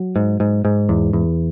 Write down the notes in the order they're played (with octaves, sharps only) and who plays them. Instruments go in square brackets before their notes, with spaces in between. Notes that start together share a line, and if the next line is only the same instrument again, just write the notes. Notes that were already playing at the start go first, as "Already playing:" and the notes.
Already playing: [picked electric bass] F#3
G#2
G#2
G#2
E2
E2